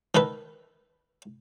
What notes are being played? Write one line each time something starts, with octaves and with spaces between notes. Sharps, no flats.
D#3 A4 B4